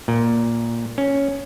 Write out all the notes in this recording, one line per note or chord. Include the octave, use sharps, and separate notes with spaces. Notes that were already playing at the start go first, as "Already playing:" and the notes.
A#2
C#4